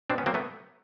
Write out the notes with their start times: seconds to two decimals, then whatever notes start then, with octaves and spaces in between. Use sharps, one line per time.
0.10 B2 C4 D4
0.18 B3 C#4
0.26 F#3 A#3 C4
0.34 A3 B3